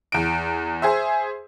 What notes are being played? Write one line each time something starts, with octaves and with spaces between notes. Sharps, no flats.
E2 D7
G#4 C5 E5